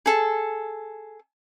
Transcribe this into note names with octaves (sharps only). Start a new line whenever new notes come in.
G#4 A4